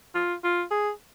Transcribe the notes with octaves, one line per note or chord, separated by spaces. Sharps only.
F4
F4
G#4